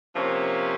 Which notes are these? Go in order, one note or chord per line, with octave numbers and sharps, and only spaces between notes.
C3 F3 A#3 C#4